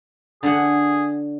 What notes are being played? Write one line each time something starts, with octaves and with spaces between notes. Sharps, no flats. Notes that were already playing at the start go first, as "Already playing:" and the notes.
D3 G#4 F#5